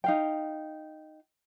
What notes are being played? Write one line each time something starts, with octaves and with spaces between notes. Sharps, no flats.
D#4 F5 G5